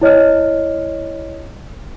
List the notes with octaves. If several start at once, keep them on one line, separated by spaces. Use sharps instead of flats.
E4 C#5 D#5 F6